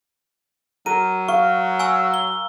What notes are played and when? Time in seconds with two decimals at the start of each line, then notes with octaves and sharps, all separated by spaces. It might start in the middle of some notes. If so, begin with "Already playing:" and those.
0.86 F#3 A#4 D#7
1.28 F5 C#6
1.79 G#5 C#6 E6
2.14 G7